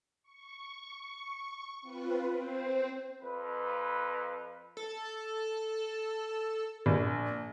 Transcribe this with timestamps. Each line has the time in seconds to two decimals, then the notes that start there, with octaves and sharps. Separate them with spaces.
0.23 C#6
1.82 C4 F4 B4
2.34 C4 C5
3.22 F2 B4
4.77 A4
6.86 A#1